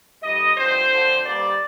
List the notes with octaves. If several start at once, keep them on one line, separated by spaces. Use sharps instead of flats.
F2 D#3 G3 D#5
G2 D3 F3 C4 C5
D3 F3 C4
G2 D3 G3 A#3 D5